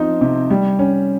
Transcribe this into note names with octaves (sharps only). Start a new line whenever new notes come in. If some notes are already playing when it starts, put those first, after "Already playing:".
Already playing: F3 C4 D#4
C3
G3
C#4